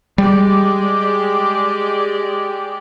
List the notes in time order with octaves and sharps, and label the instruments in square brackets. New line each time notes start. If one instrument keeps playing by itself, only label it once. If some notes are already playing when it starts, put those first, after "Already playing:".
[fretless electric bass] G3 [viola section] G#3 G4 D5